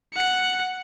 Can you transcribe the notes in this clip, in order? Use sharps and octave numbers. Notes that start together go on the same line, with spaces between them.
F#5 C#7